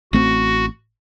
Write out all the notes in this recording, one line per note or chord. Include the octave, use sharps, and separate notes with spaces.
A1 A3 C4 F#4